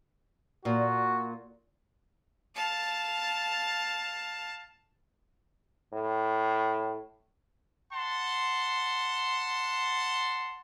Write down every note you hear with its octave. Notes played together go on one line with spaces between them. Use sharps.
A#2 F#4
F5 A5
A2
F#5 A5 C6